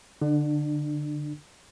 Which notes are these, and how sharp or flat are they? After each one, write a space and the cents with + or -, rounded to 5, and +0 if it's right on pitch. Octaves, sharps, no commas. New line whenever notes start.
D3 +0 D4 +30